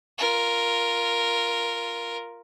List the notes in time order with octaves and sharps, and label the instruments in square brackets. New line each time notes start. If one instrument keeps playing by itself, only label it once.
[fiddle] F4 A#4